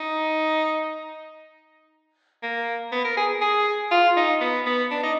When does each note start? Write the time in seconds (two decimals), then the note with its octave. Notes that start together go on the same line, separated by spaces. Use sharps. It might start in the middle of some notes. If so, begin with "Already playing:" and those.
Already playing: D#4
2.43 A#3
2.92 B3
3.05 A#4
3.17 G#4
3.41 G#4
3.91 F4
4.16 D#4
4.41 B3
4.66 B3
4.91 D4
5.03 D#4